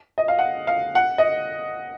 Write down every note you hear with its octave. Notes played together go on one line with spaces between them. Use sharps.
D#5
F5
F#5
F5
F#5
D#5